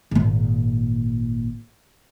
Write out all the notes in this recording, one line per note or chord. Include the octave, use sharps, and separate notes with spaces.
G#1 A#2